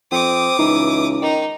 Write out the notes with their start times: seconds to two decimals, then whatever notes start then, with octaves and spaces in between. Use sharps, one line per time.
0.12 F2 C4 D6 D#6
0.59 C#2 E3 D#4
1.22 D#3 D#4